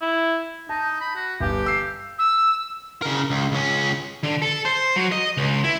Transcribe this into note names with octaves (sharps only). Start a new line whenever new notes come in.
E4
D#4 A5
B5
F#4
G1 G4
E6 C7
E6
C#3 A#4
C#2
C#2 C#4
D3
A4
C5
F#3
D#5
C#2
E4